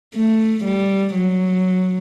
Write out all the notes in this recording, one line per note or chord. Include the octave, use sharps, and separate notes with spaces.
A3
G3
F#3